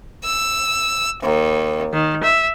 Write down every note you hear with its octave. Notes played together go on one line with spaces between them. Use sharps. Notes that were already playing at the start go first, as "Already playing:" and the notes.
E6
D#2
D#3
E5